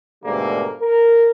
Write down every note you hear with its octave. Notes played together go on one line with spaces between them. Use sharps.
G#2 B2 D3 G3 A3 A#3
A#4